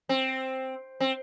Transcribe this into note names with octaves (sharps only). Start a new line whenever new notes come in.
C4
C4